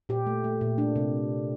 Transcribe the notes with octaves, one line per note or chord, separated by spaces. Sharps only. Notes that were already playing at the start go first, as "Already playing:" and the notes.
A#2 G4
A3
A3
A#2
A3 D4
C3